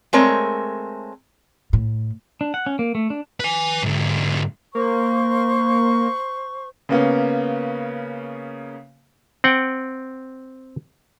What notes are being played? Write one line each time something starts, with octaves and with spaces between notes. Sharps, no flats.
G#3 A3 C4 A#4 C#5
A2
D4
F#5
C#4
A#3
A3
D4
B4 G#5
G#2 D3
A#3 C5 C#6
C#3 A#3 B3 C#4
C4 F#5 G5